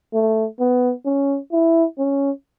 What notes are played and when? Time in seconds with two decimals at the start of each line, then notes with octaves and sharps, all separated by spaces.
0.14 A3
0.60 B3
1.06 C#4
1.52 E4
1.99 C#4